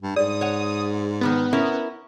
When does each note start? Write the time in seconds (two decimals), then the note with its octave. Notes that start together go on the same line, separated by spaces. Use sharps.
0.02 G2
0.16 G#2 D5 D#6
0.41 C#5 F#5
1.21 D#3 F3 B3 B4
1.53 C#4 E4 A#4